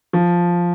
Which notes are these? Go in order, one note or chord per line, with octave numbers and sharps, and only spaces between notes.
F3